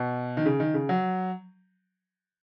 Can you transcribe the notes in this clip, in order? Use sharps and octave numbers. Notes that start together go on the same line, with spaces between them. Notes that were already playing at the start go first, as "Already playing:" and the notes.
Already playing: B2
D#3
C#3
D#3
C#3
F#3